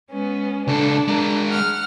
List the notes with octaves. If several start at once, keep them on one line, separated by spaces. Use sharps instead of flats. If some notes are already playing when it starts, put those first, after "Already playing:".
G#3 B3 C#4
C#2 D4 A4
G#3 A#4
F#5 F6